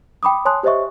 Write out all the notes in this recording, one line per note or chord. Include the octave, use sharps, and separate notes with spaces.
G5 B5 D6 D#6
C#5 G#5 A5 C6 D#6 F#6
G4 C5 C#5 D#5 E5 C#6